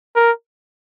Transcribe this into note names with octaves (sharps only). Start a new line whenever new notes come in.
A#4